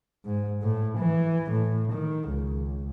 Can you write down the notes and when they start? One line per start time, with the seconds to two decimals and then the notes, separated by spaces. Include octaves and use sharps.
0.25 G#2
0.62 A2
0.98 E3
1.50 A2
1.92 D#3
2.28 C#2